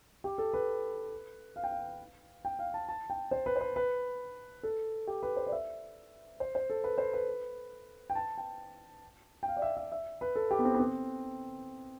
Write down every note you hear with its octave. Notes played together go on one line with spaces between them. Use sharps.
G4
A4
B4
F5
G5
F5
G5
F5
A5
A5
G5
C5
B4
C5
B4
B4
A4
G4
B4
C5
D5
E5
C5
C5
A4
B4
C5
B4
G5
A5
G5
G5
F5
D5
E5
E5
E5
B4
A4
G4
B3
C4
B3
C4